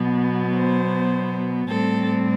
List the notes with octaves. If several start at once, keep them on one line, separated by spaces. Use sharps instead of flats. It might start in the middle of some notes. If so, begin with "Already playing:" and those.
Already playing: B2 F#3 B3
C5
A2 G3 C4 A4